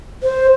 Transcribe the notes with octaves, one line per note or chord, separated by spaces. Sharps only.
C5